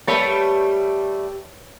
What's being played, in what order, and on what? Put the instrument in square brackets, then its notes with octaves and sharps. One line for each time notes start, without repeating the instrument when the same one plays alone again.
[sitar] G3 A3 [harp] B4 C#5 A5